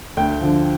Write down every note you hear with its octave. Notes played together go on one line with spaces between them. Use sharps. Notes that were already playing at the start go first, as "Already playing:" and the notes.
D2 G5
D3 F3